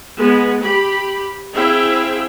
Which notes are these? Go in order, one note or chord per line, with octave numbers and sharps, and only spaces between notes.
G#3 B3
G4 B5
C4 E4 G#4 E5 F5 G5